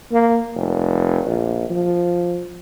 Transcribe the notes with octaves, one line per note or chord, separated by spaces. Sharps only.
A#3
F1
A#1
F3